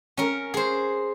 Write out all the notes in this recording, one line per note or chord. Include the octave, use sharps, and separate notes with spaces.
C#4 A#4
G#4 C5